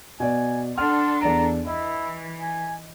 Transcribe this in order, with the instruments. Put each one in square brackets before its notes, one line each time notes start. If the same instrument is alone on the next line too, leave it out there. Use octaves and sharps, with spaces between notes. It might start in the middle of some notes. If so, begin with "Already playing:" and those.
[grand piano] B2 D5 [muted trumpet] G#5
[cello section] D4 A4 [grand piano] F#5 F6 [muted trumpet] C6
[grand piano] E2 D5 D7 [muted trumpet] A#5
[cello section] E3 [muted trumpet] E4 [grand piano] D#5
[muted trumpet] G#5